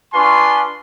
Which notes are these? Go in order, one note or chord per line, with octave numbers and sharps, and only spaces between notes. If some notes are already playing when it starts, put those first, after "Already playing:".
D4 F4 B4 G#5 C6 C#6